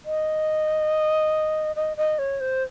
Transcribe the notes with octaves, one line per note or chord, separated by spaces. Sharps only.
D#5
D#5
D#5
C#5
C5